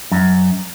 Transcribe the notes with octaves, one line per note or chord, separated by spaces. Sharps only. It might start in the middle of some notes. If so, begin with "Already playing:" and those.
F#2